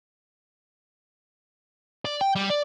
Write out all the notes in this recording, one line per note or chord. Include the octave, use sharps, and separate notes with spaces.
D5
G5
G3
D5